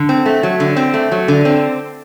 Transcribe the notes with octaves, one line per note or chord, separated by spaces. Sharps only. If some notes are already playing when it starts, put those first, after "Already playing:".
Already playing: D3
C4
A3
F#3
D3
C4
A3
F#3
D3
C4